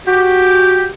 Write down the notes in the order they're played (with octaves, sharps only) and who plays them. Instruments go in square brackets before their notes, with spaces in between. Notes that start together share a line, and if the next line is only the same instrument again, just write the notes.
[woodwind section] F#4 G4